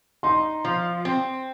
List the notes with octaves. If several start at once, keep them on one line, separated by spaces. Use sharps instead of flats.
D#4 C6
F3
C4